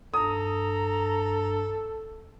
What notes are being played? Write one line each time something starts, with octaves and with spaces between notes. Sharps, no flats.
G2 A4 A#5 D#6